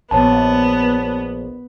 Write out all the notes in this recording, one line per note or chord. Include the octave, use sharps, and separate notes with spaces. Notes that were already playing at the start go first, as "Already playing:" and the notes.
A#1 B3 C#5 A5